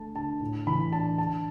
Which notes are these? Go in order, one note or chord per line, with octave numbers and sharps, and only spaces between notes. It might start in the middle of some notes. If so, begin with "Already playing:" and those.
Already playing: D3 A3 A5
D3 A5
A2
E3 B5
D4 A5
D3 A5